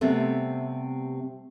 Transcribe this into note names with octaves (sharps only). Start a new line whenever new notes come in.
C3 G3 A3 B3 C4